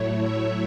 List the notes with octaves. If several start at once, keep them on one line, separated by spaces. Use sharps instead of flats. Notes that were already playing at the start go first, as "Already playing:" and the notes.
Already playing: A2 F#3 A3 E4 C#5
E5